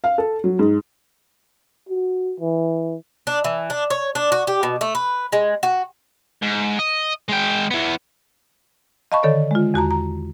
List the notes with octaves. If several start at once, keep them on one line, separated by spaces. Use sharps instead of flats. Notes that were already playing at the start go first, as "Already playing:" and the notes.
F5
A4
F#3
G#2
F#4
E3
D4
E3
D4
C#5
D4
F#4
G4
B2
A3
B4
G#3
F#4
G#2
D#5
G#3 G5
E3 B3
D#5 F5 A5 B5 C#6
D3 D#3 A4 C#5 D5
G#3 F4
E2 F#4 A5 A#5
A#5